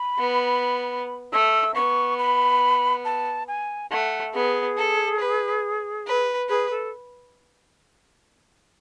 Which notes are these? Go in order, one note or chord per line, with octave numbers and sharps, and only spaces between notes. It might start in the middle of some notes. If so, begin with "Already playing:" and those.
Already playing: B5
B3
A3 E6
B3 C#6
B5
A5
G#5
A3 F#5
B3 G#4
A4
B4
B4
G#4 B4
A4